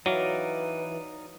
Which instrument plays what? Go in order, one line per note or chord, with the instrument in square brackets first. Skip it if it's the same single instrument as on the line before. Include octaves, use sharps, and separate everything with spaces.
[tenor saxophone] E3 [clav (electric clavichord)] F#3 [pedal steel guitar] D#4 D5 F5 [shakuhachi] B4